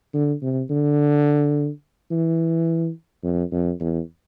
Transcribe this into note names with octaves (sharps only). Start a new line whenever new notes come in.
D3
C3
D3
E3
F2
F2
E2